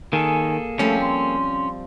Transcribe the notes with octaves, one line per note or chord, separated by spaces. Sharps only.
D#3 A#3 G#4 A4 G#5
F3 G3 A3 C4 C#4
C6